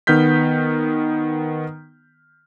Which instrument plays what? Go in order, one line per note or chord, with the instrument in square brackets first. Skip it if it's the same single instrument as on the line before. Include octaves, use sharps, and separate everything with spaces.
[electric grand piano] D#3 B3 F6 G6 B6